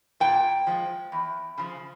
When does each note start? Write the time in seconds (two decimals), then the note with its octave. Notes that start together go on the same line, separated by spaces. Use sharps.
0.20 A#2 G5
0.67 F3 G#3
1.12 E2
1.58 C#3 F3